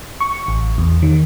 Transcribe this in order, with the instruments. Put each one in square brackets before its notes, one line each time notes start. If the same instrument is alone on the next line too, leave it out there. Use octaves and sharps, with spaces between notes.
[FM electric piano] C#6
A1
E2
D#3